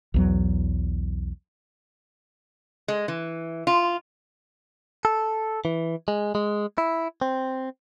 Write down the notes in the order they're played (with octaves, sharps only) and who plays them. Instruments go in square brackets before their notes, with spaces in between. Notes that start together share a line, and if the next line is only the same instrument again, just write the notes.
[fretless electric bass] B1 E2 F#3
[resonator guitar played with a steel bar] G#3
E3
F4
[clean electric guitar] A4
E3
G#3
G#3
E4
C4